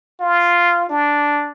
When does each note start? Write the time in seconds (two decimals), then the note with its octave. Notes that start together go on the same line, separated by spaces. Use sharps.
0.20 F4
0.89 D4